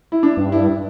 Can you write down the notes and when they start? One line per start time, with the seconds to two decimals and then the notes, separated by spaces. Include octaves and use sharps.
0.12 E4
0.23 D4
0.37 G2
0.52 E4